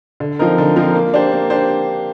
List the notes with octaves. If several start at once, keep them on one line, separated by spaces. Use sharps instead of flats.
D3
F3 C4 D#4 A#4
D3
F3 C4 D#4 A#4
A#3
D4 G4 C5
A#3
D4 G4 C5